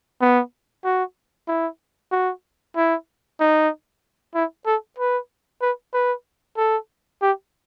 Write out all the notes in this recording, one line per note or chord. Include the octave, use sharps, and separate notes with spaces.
B3
F#4
E4
F#4
E4
D#4
E4
A4
B4
B4
B4
A4
G4